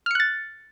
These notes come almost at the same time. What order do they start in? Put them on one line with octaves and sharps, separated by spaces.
F6 C#7 F#6 A6